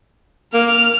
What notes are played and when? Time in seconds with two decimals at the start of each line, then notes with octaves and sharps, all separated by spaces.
0.54 A#3 F6